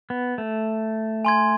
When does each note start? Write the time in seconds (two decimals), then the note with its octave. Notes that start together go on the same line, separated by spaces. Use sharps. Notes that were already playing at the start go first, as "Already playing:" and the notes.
0.10 B3
0.38 A3
1.25 G#5 C6 G#6